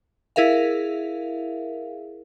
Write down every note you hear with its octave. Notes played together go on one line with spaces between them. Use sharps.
E4 G#4 A#4 E5 F5